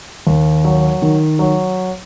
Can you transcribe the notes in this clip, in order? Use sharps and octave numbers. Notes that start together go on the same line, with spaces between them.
D#2
F#3
D#3
F#3